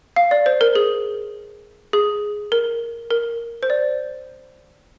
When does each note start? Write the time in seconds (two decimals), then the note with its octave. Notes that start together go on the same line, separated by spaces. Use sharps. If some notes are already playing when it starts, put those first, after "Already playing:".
0.16 F5
0.31 D5
0.46 C5
0.61 A#4
0.75 G#4
1.93 G#4
2.52 A#4
3.11 A#4
3.63 C5
3.70 D5